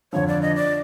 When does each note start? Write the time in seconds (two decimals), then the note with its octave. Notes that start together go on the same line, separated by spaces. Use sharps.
0.13 F2 D3 F3 C#5
0.28 D5
0.42 D#5
0.56 D5